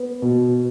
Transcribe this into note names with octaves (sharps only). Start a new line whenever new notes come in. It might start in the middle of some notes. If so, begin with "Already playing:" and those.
Already playing: B3
B2